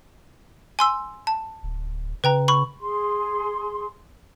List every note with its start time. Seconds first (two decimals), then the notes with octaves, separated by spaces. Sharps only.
0.79 G#5 C6 E6
1.27 A5
1.63 D1
2.24 C#3 B4 G5 A#5
2.48 B5 C#6
2.79 G#4 C6